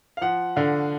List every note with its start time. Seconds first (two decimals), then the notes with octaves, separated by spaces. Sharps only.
0.17 F5
0.21 F3 F#5
0.56 D3 F5